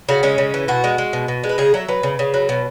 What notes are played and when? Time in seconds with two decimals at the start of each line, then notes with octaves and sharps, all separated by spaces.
0.09 C#3 F#4
0.23 G#3 C#4
0.38 C#3
0.54 E3
0.68 B2 F#4
0.84 G#3
0.98 G#3
1.13 B2
1.28 B2
1.44 G#3
1.49 B4
1.58 C#3 G#4
1.74 F#3 E5
1.88 F#3 B4
2.03 C#3
2.19 C#3
2.34 F#3
2.49 B2